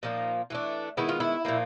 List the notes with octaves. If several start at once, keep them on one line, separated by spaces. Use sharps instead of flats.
A#2 F3 A#3 D#4
E3 A3 D4
D#3 G#3 B3 E4
F4
E4
A#2 F3 A#3